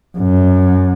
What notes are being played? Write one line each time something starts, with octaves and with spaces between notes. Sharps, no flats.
F#2